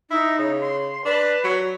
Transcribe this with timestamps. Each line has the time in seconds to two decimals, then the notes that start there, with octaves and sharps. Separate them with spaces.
0.11 D#4 E4
0.39 C#3
0.61 C6
1.05 D4 B4
1.44 F#3